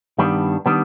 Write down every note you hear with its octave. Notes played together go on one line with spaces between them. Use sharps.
G2 D#3 G3 B3 D4
D#3 G3 B3 D4